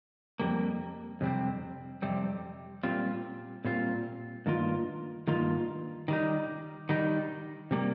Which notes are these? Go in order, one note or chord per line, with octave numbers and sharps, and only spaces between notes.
F2 C3 G3 A#3
F2 C3 G3 C4
F2 C3 G3 C4
A#2 G3 C4 F4
A#2 G3 C4 F4
G2 D#3 A#3 F4
G2 D#3 A#3 F4
D#3 G3 D#4
D#3 G3 D#4
C3 G3 A#3